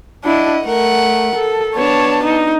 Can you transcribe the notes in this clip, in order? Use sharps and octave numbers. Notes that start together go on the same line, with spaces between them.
D4 E4 D#5 F#5
A3 A#4 F#5
A4
B3 D4 C#5 A5
D#4